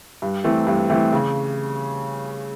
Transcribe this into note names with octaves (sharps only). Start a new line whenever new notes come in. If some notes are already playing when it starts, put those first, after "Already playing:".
G2
E3 A3 C4
G2
E3 A3 C4
C#3